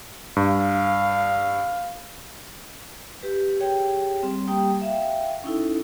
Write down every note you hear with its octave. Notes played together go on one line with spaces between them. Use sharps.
G2 F5
G4 B4
G4 G#4 C#5 G5
G3 C4
G3 A#3 G4 G5 D#6
E5 F5 G5
C#4 D#4 E4 A4